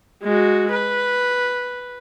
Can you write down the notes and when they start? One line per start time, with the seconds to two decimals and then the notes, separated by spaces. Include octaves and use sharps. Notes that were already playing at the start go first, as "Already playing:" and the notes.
0.23 G#3 F#4
0.71 B4